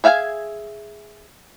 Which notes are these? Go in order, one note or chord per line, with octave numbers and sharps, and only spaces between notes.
G#4 E5 F5 G5 G#5